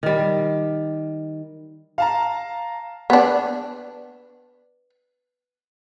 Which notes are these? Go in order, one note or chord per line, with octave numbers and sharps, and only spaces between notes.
D#3 G3
F5 A5 A#5
B3 D4